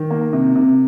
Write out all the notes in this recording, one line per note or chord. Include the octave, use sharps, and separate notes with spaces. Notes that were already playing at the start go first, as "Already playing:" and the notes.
Already playing: D#3
A#3
C3
C3